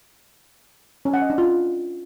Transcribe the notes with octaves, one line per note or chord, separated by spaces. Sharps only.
C#4
F#5
D#5
D4
F4